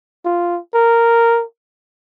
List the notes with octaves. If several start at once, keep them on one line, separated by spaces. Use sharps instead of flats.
F4
A#4